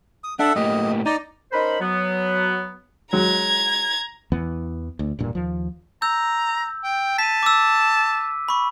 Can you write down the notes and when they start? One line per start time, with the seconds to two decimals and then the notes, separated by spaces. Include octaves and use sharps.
0.24 D#6
0.39 D4 A4 E5 F#5
0.56 A2 A#3 G4 D#5
1.06 D#4 D5 A#5
1.52 C#4 D#4 A#4 C5 B5
1.80 F#3 B3
3.13 F#3 G#3 A#5 G#6
4.32 E2 E3 B3
4.99 D2
5.19 E1 G2 A#2
5.35 D#2 F3
6.02 A#5 E6 G6
6.84 G5
7.19 A5 B6 D#7
7.43 D6 E6
8.48 B5 C#6